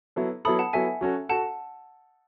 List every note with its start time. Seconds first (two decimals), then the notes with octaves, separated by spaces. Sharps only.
0.16 F#3 B3 E4 A4
0.45 F#3 B3 E4 A4 B5 D#6
0.59 F#5 A5
0.73 F#3 B3 E4 A4 E5 G#5
1.01 F#3 C#4 F#4 A4
1.29 F#4 A4 F#5 A5